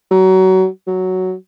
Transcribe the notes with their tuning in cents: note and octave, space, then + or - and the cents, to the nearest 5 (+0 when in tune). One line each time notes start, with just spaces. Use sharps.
F#3 +25
F#3 +5